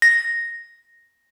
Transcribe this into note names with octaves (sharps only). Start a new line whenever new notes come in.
A#6